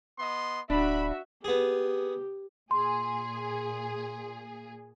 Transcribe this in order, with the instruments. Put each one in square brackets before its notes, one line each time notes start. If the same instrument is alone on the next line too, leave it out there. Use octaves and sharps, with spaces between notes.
[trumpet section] B3 D#5 C6
[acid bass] D1 [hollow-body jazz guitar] D4 [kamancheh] F#4 E5 [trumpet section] B5
[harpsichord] B3 G#4 [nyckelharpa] G4
[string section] A#2 G#4 [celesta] C6